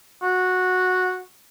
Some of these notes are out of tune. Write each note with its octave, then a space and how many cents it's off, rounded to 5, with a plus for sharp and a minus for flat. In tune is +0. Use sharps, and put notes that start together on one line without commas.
F#4 -10